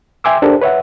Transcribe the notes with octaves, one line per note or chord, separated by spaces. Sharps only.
E5 G5 G#5 C6 D6 E6
D4 G4 A4 A#4 C5
B4 C#5 E5 F#5